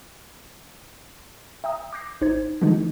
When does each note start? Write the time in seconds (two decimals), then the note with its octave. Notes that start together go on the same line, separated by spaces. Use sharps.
1.64 E5 G5 A#5 D#6
1.93 D6 F#6 G6 A#6 C7
2.21 A1 D#4 C5 G#6
2.61 D3 E3 F3 G#3 A3 D#4